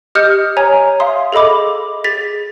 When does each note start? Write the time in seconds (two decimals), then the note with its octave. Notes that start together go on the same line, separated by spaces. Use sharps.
0.15 G4 D#5 D#6 F6 G6 C#7
0.57 C#5 G#5 A#5
1.00 E5 F5 C6 D#6
1.32 G#4 A4 D#5 B5 D6
2.04 G#4 A6 B6